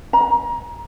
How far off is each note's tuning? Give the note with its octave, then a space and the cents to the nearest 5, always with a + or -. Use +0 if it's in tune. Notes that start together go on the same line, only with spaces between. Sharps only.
A#5 +25